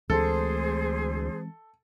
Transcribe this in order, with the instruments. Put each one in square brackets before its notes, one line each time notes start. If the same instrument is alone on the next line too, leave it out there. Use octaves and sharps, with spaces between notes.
[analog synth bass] D2 [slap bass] E3 G#3 C4 [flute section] G#4 C5 [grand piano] A4